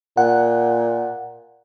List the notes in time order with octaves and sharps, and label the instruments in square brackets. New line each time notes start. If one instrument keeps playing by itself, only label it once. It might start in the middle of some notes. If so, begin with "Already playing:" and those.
[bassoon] A#2 [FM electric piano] F#5